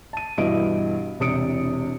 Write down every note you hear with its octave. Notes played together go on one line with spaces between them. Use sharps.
A5 D#7
G2 B2 E3 E4 D#5 D7
E1 C3 D4 D#6 C#7 D7